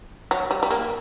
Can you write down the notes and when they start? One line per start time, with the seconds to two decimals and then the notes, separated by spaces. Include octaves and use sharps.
0.31 F#3
0.51 G3
0.63 G3
0.71 A#3